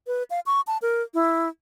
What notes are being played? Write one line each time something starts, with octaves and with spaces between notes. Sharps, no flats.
B4
F5
C#6
A5
A#4
E4